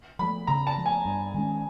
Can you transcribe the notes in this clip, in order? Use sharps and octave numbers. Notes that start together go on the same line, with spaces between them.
F3 A3 B5
C#3 A#5
A5
F3 A3
G#5
G2
D#3 G#3 C#4